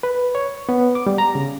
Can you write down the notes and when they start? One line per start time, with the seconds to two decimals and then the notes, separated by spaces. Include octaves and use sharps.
0.03 B4
0.35 C#5
0.69 B3
0.95 D6
1.07 G3
1.18 A#5
1.35 C#3